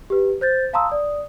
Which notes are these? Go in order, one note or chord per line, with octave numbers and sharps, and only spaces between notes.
G4 B4
C5 G6 A6
F5 A5 A#5 C6 D#6 E6
D5 D#6